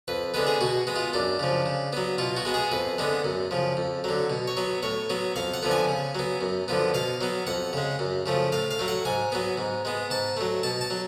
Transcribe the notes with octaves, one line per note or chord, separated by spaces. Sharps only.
F2 B4
D3 G#3 B3 B4
G#4
B2 F#4
G#3 B3
F4
F#2 D4
C#3 F3
C#3
F#3 B3
B2 F4
F#4
G#3 B3
G#4
F2 B4
D3 G#3 B3
F#2
C#3 F3
F2
D3 F#3
B2
C#5
F#3 B3
A2 C#5
F#3 B3
F2 F5
F#5
D3 F3 B3
G#5
C#3
F#3 B3
F#2
D3 F3 B3
B2 F5
F#3 B3
F2 F#5
C#3 G#3
F#2
C#3 F3 A3
A2 F5
F5
F#3 A3
F#5
G#2 G#5
F#3 B3
G#2
G#3 B3
G#2 A5
F#3 A3
B2 A5
A5
F#3